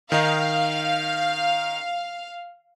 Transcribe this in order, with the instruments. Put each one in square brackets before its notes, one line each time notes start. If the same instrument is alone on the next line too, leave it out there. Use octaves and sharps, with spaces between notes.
[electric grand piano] D#3 D#4 [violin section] F5